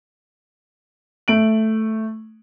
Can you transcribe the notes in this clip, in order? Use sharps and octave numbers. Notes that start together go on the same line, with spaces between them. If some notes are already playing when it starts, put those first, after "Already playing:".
A3 D7 F#7